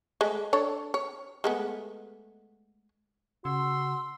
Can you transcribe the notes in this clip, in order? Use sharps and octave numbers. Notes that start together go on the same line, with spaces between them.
G#3 A3
D4 A4 C#5
C#5
G#3 A3 B3
C#3 F#4 C6 E6